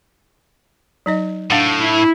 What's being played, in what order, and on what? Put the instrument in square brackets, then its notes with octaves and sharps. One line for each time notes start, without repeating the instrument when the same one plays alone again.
[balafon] F#3 D#4 D#5
[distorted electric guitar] A2 [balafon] D4 F5 F#5
[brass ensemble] E4